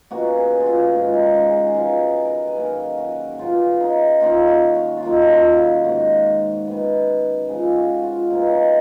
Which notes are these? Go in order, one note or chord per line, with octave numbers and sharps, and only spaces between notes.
B2 A#3 C#4 F#4
G#4
F4
F#4
G#2 D#3 G#3 C#4 F4
D#4
C#4
G#4
F#4
F4
F#2 F3 B3 D#4
D#4
A#4
B4
G#4
D#3 A#3 C#4 A#4
F#4
F#4
C#3 F#3 B3 F4
D#4
D#3 A#3 C#4 F4
F#4
C#5
F4
F#2 D#3 A#3 C#4 D#4
F#4
F4
F#4
G#2 D#3 A#3 F#4
D#3 F#3 B3
C#3 F3 G#3 G#4
F#4
F4
B2 A#3 C#4 D#4
D#4